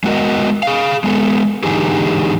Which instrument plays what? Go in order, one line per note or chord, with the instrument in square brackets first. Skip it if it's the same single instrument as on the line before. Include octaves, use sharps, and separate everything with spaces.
[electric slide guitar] G#3 B3 F#4 A#4 D#5
G#4 F5
G#3 B3 A4
G#2 D3 E3 D#4 G4 G#4